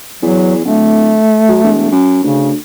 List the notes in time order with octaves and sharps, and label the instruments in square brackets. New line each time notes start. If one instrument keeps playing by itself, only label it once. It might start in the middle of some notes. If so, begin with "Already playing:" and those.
[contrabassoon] E2 [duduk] F#3
[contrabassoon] D1 [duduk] A3
[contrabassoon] F#3
E1
F#2
[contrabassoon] D2 [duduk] C#3